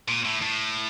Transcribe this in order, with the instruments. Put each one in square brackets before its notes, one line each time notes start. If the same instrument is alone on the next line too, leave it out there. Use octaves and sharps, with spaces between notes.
[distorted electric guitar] A#2
A2
A2